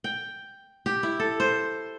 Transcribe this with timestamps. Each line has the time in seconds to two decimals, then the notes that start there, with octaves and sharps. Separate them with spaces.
0.04 G5
0.86 G4
1.03 E4
1.20 A4
1.40 C5